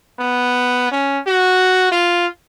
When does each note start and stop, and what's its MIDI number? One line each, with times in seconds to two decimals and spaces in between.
0.19 0.88 59
0.92 1.19 61
1.27 1.89 66
1.92 2.27 65